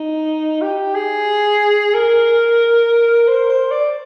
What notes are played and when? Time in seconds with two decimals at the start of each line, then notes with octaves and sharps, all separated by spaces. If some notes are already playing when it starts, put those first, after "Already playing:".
Already playing: D#4
0.62 G4
0.95 G#4
1.94 A#4
3.27 C5
3.49 C5
3.71 D5